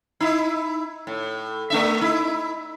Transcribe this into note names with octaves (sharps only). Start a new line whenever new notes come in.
D#4 E4
A2
A3 D4 E5
D#4 E4